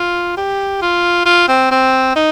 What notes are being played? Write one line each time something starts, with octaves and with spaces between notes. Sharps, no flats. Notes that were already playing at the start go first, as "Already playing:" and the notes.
Already playing: F4
G4
F4
F4
C4
C4
D#4